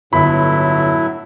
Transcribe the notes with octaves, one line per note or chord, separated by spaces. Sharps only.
G1 A2 F#3 E4 B5